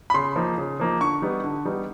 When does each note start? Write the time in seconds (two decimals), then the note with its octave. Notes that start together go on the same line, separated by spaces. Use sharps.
0.10 B5
0.14 C#3 C6
0.36 F3 A#3 D#4
0.58 C#3
0.80 F3 A#3 D#4
1.01 D3 C#6
1.22 G3 B3 D#4
1.43 D3
1.65 G3 B3 D#4